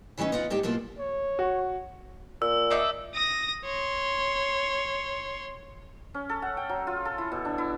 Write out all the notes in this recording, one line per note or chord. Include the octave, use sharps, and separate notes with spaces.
C#3 E3 G3 C#4 D#4
B3 D#4 F4 F#5
G#2 D4 D#4 G4
F#2 B2 A#3 E4 F4
C#5
F#4
A#2 E6
D4 D#4 E5
D#6 A#6
C#5 C6
C#4
A4
F#5
G5
F#3
F4
A4
E4
B2
D4
E4